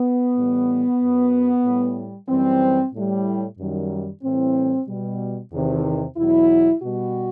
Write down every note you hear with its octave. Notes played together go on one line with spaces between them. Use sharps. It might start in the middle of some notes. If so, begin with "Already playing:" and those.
Already playing: B3
A2 E3 G3
F#2 F#3
A2 G3
F#2 E3 G3 C4
A2 G3
F#2 D#3 G3
A2 E3 G3 C4
B2 G3
E2 C3 D#3
E2 B2 F#3 E4
B2 G3 F#4